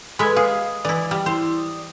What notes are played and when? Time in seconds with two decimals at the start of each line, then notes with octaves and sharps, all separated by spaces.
0.19 G#3 A4 B4 E5 B5 G#6
0.36 G#4 F5 D#6
0.85 E3 E4 D5
1.11 G3
1.26 E4 C5
1.56 D#6